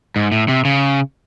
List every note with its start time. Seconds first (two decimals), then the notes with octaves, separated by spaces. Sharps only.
0.16 G#2
0.32 A2
0.48 C3
0.65 C#3